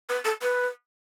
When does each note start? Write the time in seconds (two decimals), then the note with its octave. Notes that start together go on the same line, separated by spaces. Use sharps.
0.09 B4
0.25 A4
0.42 B4